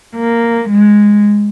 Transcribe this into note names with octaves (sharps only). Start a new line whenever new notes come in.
A#3
G#3